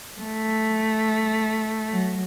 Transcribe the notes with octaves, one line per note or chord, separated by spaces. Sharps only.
A3
F#3